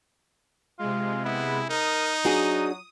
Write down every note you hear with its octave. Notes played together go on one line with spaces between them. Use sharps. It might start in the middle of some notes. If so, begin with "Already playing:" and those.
C3 G#3 F4
B3 E4
D#4 A#4 D#6
F#3 D4 F#4 G#4